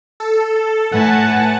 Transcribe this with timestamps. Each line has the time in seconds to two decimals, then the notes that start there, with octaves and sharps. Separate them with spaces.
0.20 A4
0.92 A2 B4 F#5 G#5 A5